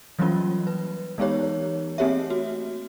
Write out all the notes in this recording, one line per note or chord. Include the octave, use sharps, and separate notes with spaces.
E3 F#3 G3 A#3 C#4 F4
B4
E3 G#3 B3 D#4 G4 C#5
A3 A#3 C4 G4 C#5 E5
F#4